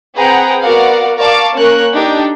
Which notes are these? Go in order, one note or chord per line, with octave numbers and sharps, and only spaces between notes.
C4 G#4 B4 F#5 G5 A#5
B3 F#4 A#4 D5 F5 F#5
A#4 D5 F5 A5 C#6 D6
A#3 C#4 A#4 C#6 F#6
D4 D#4 G4 A4 G5